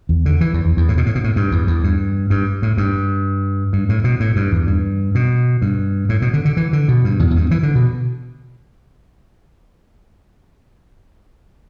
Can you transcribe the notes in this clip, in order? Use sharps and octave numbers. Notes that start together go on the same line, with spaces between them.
E2
D3
E3
E2
E2
E2
A2
B2
A2
B2
A2
G2
E2
E2
G2
G2
A2
G2
G2
A2
B2
A2
G2
E2
G2
B2
G2
A2
B2
D3
D3
E3
D3
B2
G2
E2
E2
G2
E3
D3
B2